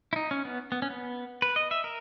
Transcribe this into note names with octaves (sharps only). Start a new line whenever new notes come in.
E4
D#4
C#4
B3
B3
C#4
B3
B4
D#5
E5
A#4